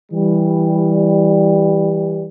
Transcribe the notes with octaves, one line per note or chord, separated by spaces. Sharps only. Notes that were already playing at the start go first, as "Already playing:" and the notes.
E3 G3